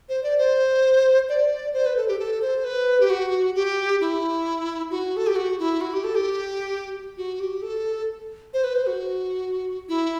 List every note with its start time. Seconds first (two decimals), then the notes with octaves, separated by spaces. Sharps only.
0.09 C5
0.23 D5
0.38 C5
1.29 D5
1.74 C5
1.86 B4
1.97 A4
2.08 G4
2.19 A4
2.42 C5
2.64 B4
3.00 G4
3.10 F#4
3.55 G4
4.01 E4
4.91 F#4
5.17 A4
5.27 G4
5.36 F#4
5.59 E4
5.81 F#4
5.93 G4
6.04 A4
6.15 G4
7.17 F#4
7.40 G4
7.62 A4
8.54 C5
8.64 B4
8.75 C5
8.87 F#4
9.89 E4